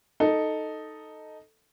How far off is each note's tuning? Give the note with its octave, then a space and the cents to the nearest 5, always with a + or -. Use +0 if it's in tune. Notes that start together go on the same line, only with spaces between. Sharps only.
D#4 +0 A4 +0